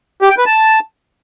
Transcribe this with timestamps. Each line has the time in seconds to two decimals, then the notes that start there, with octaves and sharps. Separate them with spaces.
0.22 G4
0.30 G5
0.38 B4
0.46 A5